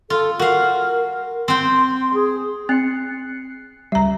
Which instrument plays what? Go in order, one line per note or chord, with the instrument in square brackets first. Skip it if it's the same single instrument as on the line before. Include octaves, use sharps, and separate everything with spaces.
[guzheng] F4 [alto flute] A4
[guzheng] F#4 F5 [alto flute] A#4
[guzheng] C4 G5 [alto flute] C6
[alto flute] G#4
[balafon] C4 [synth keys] F#6 C7 C#7
[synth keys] C#2 G3 [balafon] E5 A#5